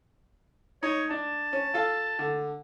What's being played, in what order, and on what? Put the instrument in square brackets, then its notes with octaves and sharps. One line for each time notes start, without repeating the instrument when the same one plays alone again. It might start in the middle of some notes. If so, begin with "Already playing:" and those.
[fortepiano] D#4 [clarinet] C#5
[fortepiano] D4 [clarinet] A5
[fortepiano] C#4
F4 A4 F5
D3